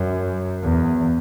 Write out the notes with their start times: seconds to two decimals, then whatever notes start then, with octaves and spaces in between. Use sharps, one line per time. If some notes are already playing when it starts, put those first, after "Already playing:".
Already playing: F#2
0.63 E2